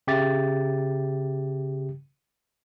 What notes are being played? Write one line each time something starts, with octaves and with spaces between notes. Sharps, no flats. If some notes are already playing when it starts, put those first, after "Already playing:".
C#3 G4 E5 A6